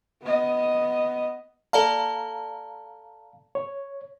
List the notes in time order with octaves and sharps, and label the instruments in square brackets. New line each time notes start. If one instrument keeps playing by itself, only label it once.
[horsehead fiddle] B3 D#5
[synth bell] A4 D5 A5 [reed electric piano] F5 A#5
[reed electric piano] C#5